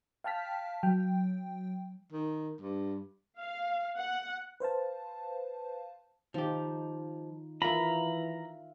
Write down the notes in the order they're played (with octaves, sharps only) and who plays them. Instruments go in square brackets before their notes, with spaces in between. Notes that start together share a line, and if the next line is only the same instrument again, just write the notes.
[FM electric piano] F5 G5 A5 F6 B6
F#3 G5
[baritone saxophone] D#3
G2
[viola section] F5
F#5
[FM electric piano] B4 C5 F5 A5
[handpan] D#3 D#4 F4 [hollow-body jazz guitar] F3 G4
[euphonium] E3 [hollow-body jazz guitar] F4 A#4 [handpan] E5 F5 [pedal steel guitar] A#5 B5